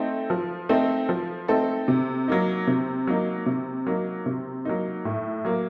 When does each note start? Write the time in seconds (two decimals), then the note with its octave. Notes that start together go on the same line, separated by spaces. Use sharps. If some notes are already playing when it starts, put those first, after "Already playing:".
Already playing: A3 C4 D#4 A4
0.30 F3
0.69 A3 C4 D#4 A4
1.09 F3
1.48 A3 C4 D#4 A4
1.88 C3
2.28 F#3 A#3 D#4
2.67 C3
3.07 F#3 A#3 D#4
3.46 C3
3.86 F#3 A#3 D#4
4.26 C3
4.65 F#3 A#3 D#4
5.05 A2
5.45 F#3 A#3